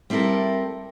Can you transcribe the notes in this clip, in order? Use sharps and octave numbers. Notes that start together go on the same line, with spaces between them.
G3 C4 E4 A4 A#4